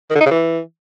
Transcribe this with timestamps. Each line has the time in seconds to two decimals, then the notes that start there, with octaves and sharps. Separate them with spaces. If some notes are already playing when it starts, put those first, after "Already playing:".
0.10 D#3
0.15 D3
0.21 D#4
0.26 C#3
0.31 E3